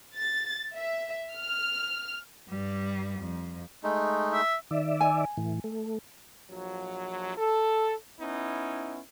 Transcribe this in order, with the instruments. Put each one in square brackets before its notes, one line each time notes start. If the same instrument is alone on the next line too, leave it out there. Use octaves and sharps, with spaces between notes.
[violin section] A6
E5
F6
[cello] G2 G3
F2
[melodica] G#3 A3 D#4
[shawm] E5
[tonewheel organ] D#3 D5 E5
[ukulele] G#5
[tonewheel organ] A2 E3
A3
[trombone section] A#1 F3 F#3
A4
B3 C#4 D#4 E4